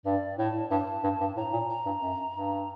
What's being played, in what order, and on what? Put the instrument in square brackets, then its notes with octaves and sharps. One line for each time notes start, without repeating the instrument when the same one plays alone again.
[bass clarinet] G2 [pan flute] D5
[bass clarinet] A2 [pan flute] A5
[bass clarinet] G2 [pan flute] A5
[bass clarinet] G2
G2
[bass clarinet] A2 [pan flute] A#5
[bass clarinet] A#2
[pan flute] A#5
[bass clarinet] G2
F#2
G2